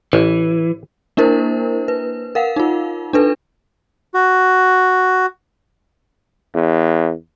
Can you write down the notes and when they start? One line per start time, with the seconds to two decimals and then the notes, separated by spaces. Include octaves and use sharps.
0.13 A1 E3
1.17 A#3 D4 E4 A#4 C5
1.88 B4
2.35 A#4 F5 F#5
2.56 D#4 F4
3.13 D4 A4 B4
4.14 F#4
6.54 E2